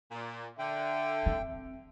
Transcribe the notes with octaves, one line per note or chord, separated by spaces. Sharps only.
A#2
D3 E5 G5
C4